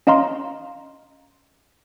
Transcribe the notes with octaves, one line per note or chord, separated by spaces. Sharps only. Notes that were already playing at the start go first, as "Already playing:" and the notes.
C#4 D#5 F5 A#5 C6